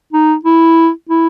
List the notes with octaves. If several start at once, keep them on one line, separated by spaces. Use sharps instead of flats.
D#4
E4
E4